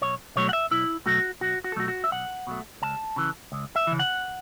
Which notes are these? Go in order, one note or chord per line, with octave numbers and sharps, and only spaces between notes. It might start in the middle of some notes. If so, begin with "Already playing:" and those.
B1 C#5
B2 F#3 A3 C#5
F#5
E5
B1 E4
B2 F#3 A3 F#4
B1 F#4
F#4
A4
B2 F#3 A3 F#4
F#4
E5
B1 F#5
B2 F#3 A3
C#2 A5
C#3 E3
C#2
E5
C#3 E3
F#5